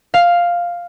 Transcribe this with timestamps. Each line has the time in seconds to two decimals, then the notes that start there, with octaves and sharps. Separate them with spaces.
0.14 F5